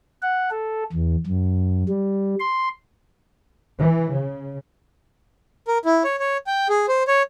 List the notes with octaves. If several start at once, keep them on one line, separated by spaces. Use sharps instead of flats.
F#5
A4
E2
F#2
G3
C6
E3
C#3
A#4
E4
C#5
C#5
G5
G#4
C5
C#5